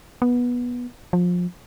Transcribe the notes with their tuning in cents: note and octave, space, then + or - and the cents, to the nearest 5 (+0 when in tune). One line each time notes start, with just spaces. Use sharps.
B3 -15
F3 +25